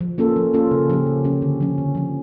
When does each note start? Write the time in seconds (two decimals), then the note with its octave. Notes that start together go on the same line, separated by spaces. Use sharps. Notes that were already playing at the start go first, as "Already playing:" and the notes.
0.01 F3
0.18 A#3 C#4 F4 A4
0.36 F3
0.54 A#3 C#4 F4 A4
0.71 C#3
0.90 F3 C#4 G4
1.06 C#3
1.24 F3 C#4 G4
1.42 D3
1.61 F3 C#4
1.78 D3
1.95 F3 C#4